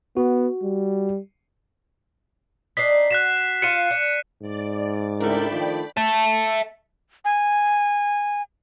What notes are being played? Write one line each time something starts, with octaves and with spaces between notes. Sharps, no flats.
B3 F#4
G3
D4 D#4 B6 C7
F#4 F#6 B6 E7
F4 F5 C#7 D#7
D4
G#2 D5
C#2 A3 D4 E4 A#4 D5 G5 B5
D#3 F3
E5 A5
G#5